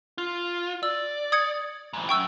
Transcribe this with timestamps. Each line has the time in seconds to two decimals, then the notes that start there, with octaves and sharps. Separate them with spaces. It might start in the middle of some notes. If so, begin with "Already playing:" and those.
0.18 F4
0.83 D5 E6
1.32 D#6 G#6 C#7
1.93 G#2 E3
2.09 F#2 G5 C#6 E6